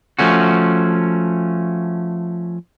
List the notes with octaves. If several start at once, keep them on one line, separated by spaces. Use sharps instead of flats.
F3 A3 C#4 F#4